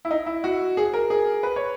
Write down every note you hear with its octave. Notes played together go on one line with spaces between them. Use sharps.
E4
D#4
E4
F#4
G#4
A#4
G#4
B4
C#5